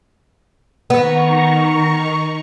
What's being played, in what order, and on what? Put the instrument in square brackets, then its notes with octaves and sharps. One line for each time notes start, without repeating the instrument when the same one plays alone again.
[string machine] D#3 A#5 C#6 [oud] B3